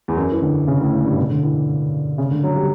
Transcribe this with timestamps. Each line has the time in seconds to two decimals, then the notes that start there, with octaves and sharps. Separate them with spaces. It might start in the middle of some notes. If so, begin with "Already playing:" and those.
0.08 E2
0.17 F#2
0.32 E3
0.42 D3
0.67 C#3
0.81 A2
0.93 A2
1.05 G2
1.17 B2
1.30 D3
1.43 E3
2.18 C#3
2.31 D3
2.43 F#3
2.56 G3